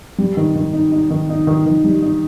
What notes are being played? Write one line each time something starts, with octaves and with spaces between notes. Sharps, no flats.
G3
D#3
D#3
D#4
D#4
D#3
D#4
D#3
D#3
G3
D#4